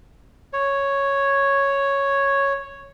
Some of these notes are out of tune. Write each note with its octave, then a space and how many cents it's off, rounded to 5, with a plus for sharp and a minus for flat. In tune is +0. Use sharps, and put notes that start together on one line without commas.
C#5 +0